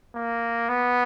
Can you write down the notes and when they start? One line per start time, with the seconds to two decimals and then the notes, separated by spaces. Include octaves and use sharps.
0.15 A#3
0.69 B3